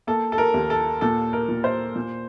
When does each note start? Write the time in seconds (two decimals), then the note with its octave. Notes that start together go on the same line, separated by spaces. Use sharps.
0.07 A#3 A4
0.32 A4
0.38 A#4
0.54 D#2
0.70 A4
1.01 A#2 A4
1.33 A#4
1.49 A#2
1.64 C5
1.96 A#2